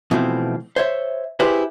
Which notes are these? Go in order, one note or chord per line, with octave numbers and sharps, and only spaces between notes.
B2 E3 F3 A3 C4
C5 C#5 E5
E4 G4 G#4 B4 C5